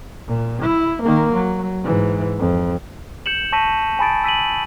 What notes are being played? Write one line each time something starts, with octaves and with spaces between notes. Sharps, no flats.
A#2
E4
D#3 A#3
F#3
G#2 E3
F2
G6 C#7 E7 F#7
A5 C#6 E6 A#6 B6 D#7
G#5 A5 B5 D#6 A6 D7
E6 B6 D#7 F#7